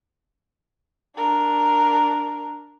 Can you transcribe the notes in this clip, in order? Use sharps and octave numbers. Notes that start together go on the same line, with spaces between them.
D4 A#4